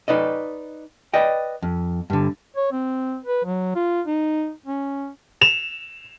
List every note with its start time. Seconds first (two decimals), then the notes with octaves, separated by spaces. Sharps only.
0.08 D#4 B4 D5 D#5
1.14 B4 D5 D#5 G5
1.62 F2
2.10 G2 D3
2.56 C#5
2.72 C4
3.24 B4
3.45 F#3
3.75 F4
4.06 D#4
4.66 C#4
5.41 E7 F7